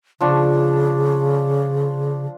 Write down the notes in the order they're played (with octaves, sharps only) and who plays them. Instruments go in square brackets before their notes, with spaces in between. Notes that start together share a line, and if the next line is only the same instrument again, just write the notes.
[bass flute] C#3 [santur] F3 D4 C#6